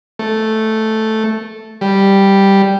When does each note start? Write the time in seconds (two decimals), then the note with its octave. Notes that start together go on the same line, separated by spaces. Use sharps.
0.19 A3
1.81 G3